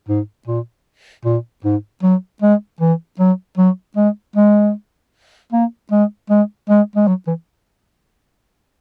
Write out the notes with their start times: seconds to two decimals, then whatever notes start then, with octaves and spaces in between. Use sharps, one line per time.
0.09 G#2
0.47 A#2
1.25 A#2
1.64 G#2
2.03 F#3
2.42 G#3
2.81 E3
3.19 F#3
3.58 F#3
3.97 G#3
4.36 G#3
5.53 A#3
5.92 G#3
6.30 G#3
6.69 G#3
6.96 G#3
7.08 F#3
7.27 E3